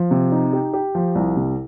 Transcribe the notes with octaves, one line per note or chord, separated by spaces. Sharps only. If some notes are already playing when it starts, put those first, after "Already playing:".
Already playing: F3
C3
D#4
G4
G4
F3
C2
C3